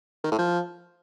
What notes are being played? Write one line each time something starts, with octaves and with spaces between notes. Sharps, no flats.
D#3
A2
F3